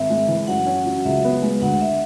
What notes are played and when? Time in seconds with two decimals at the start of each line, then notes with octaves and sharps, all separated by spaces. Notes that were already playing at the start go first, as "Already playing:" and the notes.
Already playing: G#1 E5
0.10 G#3
0.28 E3
0.47 F#2 F#5
0.66 C#4
0.86 F#3
1.05 C#2 E5
1.24 B3
1.43 G#3
1.62 D2 F#5
1.81 E5